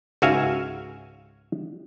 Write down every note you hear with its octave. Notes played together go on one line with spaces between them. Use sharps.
C#2 G#2 F#4 E5 F5 G#5